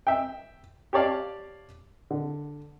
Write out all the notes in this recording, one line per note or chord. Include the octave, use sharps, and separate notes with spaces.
E5 G5
G4 C#5 D5 F5 A5
D3